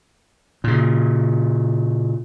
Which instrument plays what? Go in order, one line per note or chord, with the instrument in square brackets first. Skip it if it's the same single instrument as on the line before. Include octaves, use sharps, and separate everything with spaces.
[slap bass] A#2 C#3